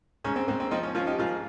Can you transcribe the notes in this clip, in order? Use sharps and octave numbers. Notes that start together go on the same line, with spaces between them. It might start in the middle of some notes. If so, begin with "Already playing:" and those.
G#2 C#4
C4
G#2 C4
C4
F3 C4 D#4
C#4
F3 C#4 F4
D#4 G4
G#2 F4 G#4